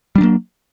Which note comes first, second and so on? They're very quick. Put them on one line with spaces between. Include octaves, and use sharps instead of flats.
G3 D4 F#3 A#3